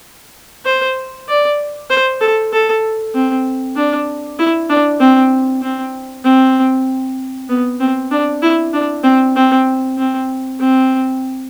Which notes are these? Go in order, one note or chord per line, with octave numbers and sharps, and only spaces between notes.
C5
D5
C5
A4
A4
C4
D4
E4
D4
C4
C4
C4
B3
C4
D4
E4
D4
C4
C4
C4
C4